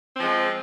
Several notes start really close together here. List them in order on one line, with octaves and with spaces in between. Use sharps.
C4 F3 G#3